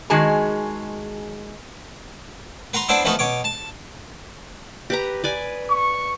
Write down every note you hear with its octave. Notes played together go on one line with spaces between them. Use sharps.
D#3 G#3 F#4 G#4 G#5 A5
B4 F#5 A#5 C6
B3 D4 E4 C5 D5 E5
E3 F3 A3 B3 D#4 F#4
B2 C#5 D6
A5
G4 B4 A#5
B4 D5 G#5
C#6